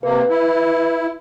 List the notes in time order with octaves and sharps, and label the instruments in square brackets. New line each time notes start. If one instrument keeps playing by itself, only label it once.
[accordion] C3 A#3 [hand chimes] B4
[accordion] E4